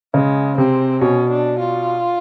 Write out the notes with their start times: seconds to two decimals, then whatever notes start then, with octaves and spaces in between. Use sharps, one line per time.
0.14 C#3 G#3
0.57 C3 C4
1.01 B2 C#4
1.30 D4
1.59 F4